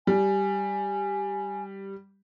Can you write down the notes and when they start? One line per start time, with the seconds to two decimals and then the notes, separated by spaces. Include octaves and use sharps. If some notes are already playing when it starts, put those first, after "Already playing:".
0.07 G3 G#5